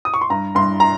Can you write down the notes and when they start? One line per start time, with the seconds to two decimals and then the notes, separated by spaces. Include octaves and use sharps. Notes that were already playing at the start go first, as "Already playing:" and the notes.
0.05 D#6
0.14 C#6
0.21 C6
0.30 G2 A#5
0.55 G2 C6
0.80 A#5